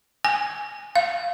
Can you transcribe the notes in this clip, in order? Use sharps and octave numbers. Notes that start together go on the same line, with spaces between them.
G#5
F5